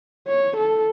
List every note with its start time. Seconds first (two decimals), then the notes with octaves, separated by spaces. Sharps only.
0.27 C#5
0.57 A4